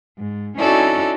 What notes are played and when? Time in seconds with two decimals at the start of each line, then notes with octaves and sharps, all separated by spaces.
0.18 G#2
0.58 C#4 D#4 E4 F#4 A4 D5